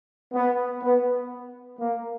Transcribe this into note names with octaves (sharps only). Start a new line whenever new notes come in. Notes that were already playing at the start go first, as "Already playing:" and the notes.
B3
B3
A#3